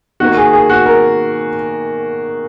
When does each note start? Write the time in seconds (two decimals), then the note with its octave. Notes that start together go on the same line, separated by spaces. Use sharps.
0.20 D#3 A#3 F#4
0.37 G#4
0.53 G#4
0.69 F#4
0.86 A#4